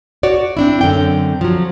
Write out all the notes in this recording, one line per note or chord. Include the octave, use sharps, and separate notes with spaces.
F#4 C#5 D5
C4 D4 E4
F#2 D3 C4 G5
F3 F#3